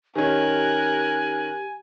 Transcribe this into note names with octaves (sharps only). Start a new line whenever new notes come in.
D#3 C#4 G4 A#4 G#5 F#6